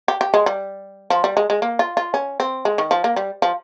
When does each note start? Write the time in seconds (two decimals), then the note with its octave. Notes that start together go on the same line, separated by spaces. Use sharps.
0.08 G4
0.21 G4
0.34 G#3
0.46 G3
1.10 F3
1.24 G3
1.37 G#3
1.50 G#3
1.62 A#3
1.79 F4
1.97 F4
2.14 C#4
2.40 C4
2.65 G#3
2.78 D#3
2.91 F3
3.04 A#3
3.16 G3
3.42 F3